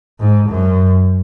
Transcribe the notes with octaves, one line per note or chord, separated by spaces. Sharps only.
G#2
F#2